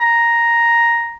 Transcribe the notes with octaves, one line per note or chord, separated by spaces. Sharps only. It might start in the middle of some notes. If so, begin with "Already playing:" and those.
A#5